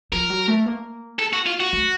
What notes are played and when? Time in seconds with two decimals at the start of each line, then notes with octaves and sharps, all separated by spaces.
0.12 F3 A#4
0.30 F#3
0.48 A3
0.66 A#3
1.19 A4
1.33 F#4
1.46 F4
1.60 F#4
1.73 A3